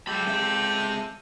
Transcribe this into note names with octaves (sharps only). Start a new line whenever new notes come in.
F#3 G#3 F4 G4 A4 B5
C4 E5